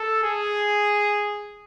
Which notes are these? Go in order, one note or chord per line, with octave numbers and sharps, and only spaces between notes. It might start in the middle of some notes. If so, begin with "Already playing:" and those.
Already playing: A4
G#4